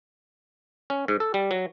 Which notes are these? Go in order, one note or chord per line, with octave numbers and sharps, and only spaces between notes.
C#4
G#2
A4
G3
F#3